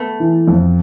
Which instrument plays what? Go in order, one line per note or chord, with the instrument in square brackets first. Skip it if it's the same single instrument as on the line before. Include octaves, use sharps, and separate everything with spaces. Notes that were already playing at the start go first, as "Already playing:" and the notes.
Already playing: [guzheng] A3 B3
[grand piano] E3
F2